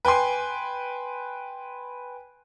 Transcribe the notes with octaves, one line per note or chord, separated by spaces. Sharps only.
B4 G5 G#5 C6